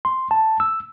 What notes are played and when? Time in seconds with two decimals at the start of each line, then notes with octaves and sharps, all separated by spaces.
0.05 C6
0.31 A5
0.60 E6